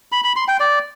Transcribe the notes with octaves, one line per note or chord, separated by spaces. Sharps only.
B5
B5
C6
G5
D5